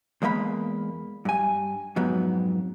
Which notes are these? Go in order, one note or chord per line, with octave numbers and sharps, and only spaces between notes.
E2 G#3 A#3 E5 B5
G2 G#5
F2 G#2 F#3 B3